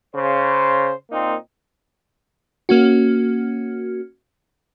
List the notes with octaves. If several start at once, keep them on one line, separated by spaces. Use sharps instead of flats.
C#3 C5
A#2 A#3 C4 D#4
A#3 C#4 F#4